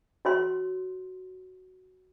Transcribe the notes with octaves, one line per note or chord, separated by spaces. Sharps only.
F#4 C#5 C6